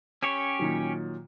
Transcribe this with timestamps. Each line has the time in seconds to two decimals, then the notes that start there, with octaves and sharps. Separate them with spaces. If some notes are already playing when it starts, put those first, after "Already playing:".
0.22 C#4 G4 C#5 E7
0.59 A#2 D#3 F#3